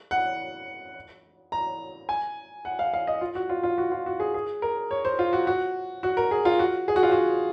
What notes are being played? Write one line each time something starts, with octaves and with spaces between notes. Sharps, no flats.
F#5
A#5
G#5
F#5
F5
F5
D#5
F4
F#4
F4
F4
F#4
F4
F#4
G#4
G#4
A#4
C#5
C5
F4
F#4
F#4
F#4
A#4
G#4
F4
F#4
G#4
F#4
F4
F#4